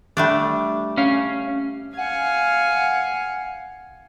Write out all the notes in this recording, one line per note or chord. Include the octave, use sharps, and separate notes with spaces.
G3 A3 D4
C#4 C#5 F5
F5 F#5 G#5